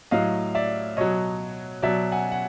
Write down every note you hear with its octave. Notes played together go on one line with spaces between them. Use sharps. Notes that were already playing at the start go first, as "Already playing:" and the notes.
A2 F#3 D#5 F5
D5 E5
B2 F#3 C#5 D#5
B2 F#3 D5 E5
F#5 G#5
F#5